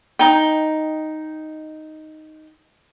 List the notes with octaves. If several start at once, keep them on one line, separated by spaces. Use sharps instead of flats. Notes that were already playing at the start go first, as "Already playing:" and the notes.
D#4 G5